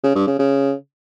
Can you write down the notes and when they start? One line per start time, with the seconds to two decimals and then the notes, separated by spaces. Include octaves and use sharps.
0.04 C#3
0.15 G2
0.27 C#3
0.39 C#3